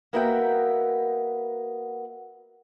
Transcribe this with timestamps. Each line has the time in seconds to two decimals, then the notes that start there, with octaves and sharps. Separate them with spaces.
0.13 A#3 B3 F#4 A#4 E5 G5